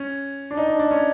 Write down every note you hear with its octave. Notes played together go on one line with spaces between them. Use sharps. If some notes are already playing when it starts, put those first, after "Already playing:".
Already playing: C#4
D4
D#4
D4
D4
C#4